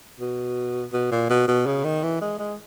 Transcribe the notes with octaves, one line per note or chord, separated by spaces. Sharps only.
B2
B2
A#2
B2
B2
C#3
D#3
E3
G#3
G#3